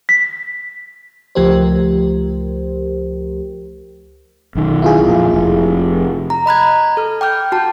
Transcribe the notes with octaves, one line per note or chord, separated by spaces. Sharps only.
B6
C#2 F3 A3 G4 A#4 C5
B1 D#3
E4 F4 G#4
F2 A#2
F1
A#5
D#5 B5 F#6 G#6
A4 F6
G5 D6 F6 G6
F#4 A5